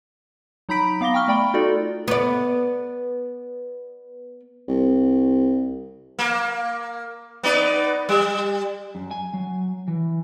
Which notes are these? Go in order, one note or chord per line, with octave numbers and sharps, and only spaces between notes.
F#3 D#4 A#5 B5 B6 D7
B3 F5 D6 A#6 G7
G5 C#6 F6 G7
A3 D5 G5 B5 D7
D#4 F4 F#4 A4 D5
B3 D5
C2
A#3
B3 D#4 D5
G3
F#2
G#5
F#3
E3